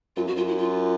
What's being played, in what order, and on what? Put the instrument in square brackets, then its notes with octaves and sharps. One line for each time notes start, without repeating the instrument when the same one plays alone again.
[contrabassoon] F#2 [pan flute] F4
[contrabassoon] F2 [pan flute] F#4
[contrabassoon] F#2 [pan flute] F4
[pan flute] E4
F4